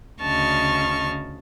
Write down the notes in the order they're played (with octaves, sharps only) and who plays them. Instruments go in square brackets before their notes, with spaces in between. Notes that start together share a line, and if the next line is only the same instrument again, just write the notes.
[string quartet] D2 C#3 D#5 A5 C#6 F6